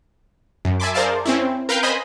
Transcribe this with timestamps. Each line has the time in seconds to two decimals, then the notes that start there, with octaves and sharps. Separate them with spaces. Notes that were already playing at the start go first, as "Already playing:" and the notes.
0.65 F#2
0.80 E5 G#5 A5 B5 C6 D6
0.94 G#4 A#4 C5 D5 F5 A5
1.25 C4 C#4 E4
1.69 A#4 B4 F5 G5 F6 G6
1.83 C5 D#5 G#5 B5